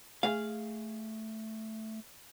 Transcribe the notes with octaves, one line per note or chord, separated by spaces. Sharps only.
A3 G#4 F5